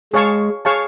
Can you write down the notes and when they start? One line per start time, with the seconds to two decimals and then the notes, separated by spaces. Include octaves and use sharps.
0.13 G#3 G#4 C#5 F5 A5 C#6
0.65 G#4 C#5 F5 A5 C#6